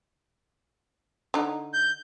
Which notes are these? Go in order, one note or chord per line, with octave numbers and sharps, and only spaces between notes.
D3 D#4
G6